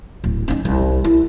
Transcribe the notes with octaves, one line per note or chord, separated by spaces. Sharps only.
D1
C#4 D#4
C2
E4